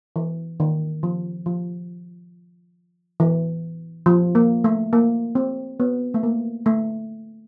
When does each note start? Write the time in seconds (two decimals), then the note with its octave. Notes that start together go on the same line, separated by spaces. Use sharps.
0.16 E3
0.60 D#3
1.03 F3
1.46 F3
3.20 E3
4.06 F3
4.35 A#3
4.64 A3
4.93 A#3
5.35 C4
5.80 B3
6.14 A3
6.23 A#3
6.66 A3